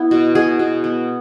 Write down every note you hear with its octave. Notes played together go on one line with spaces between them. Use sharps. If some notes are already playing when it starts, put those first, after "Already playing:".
Already playing: B3 E4
B2
B2 G#4
B2
B3